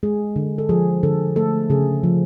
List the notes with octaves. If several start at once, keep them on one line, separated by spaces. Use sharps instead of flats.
G#3 G#4
D3
A4
F3 G#4
D3 A4
A3 A4
C#3 G#4
F3